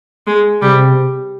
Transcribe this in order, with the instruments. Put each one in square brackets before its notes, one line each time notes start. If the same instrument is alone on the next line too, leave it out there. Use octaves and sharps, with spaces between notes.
[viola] G#3
[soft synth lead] C3 [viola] G3